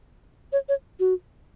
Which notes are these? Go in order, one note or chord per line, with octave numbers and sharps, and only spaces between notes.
C#5
C#5
F#4